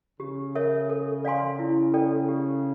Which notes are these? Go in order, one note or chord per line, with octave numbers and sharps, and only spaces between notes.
C#3 G4
A#4 C#5 E5
A4
D5 F5 G#5 C6
E4
A4 D5 G5
G4